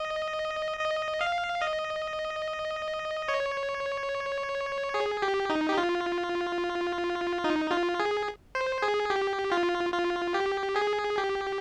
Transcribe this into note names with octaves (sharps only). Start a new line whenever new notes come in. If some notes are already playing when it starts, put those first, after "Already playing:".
Already playing: D#5
D#5
F5
D#5
C#5
G#4
G4
D#4
G4
F4
D#4
F4
G#4
C5
G#4
G4
F4
F4
G4
G#4
G4